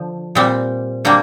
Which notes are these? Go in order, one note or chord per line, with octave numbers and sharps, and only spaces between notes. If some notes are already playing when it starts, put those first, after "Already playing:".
Already playing: D3 F3
A#2 G3 C4
D3 G3 A#3